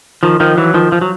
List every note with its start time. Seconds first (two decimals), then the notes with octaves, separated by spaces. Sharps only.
0.23 D#3 F3
0.40 D#3 F3
0.57 E3 F#3
0.74 D#3 F3
0.92 F3
1.01 F#3